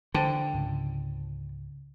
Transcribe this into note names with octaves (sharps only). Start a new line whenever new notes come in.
D3 C5 G5 A5
C#2 G#2 C#3